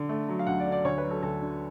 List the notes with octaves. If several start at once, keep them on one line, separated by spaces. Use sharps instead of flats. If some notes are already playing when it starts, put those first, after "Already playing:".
Already playing: D3
A3
F#3
F5
D2 F#5
D5
D3
D5
D2 C#5
B4
F#3
A4
D2 A4
D3